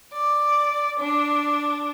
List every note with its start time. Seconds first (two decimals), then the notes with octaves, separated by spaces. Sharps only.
0.12 D5
0.99 D4